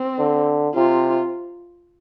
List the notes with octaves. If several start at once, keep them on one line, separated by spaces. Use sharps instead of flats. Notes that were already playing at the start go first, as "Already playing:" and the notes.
Already playing: C4
D3
C3 F4